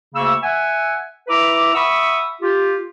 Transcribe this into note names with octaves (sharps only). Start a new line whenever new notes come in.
D2 C#3 A#3 C#6 E6
E5 F#5 G#5
E4 B4 E5 A#5 D6
E5 F#5 B5 C#6 D#6 E6
F4 G4